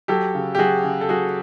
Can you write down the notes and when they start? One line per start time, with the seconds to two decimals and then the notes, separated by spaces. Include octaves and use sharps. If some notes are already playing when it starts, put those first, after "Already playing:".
0.08 F#3 G4 A4
0.35 C#3
0.55 G4
0.59 F#3 F#4 G#4
0.84 C#3
1.01 A4
1.09 F#3 F#4 G#4